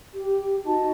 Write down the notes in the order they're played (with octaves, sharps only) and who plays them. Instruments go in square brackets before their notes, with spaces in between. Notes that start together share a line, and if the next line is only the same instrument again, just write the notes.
[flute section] G4
D#4 F#4 D#5 A5